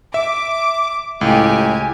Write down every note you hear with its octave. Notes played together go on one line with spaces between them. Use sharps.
E5 D6
C#2 A2 G4 G#5